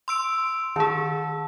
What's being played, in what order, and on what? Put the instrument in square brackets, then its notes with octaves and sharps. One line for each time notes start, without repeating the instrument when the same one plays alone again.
[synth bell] C6 E6 D7
[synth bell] D#3 G#4 [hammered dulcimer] A4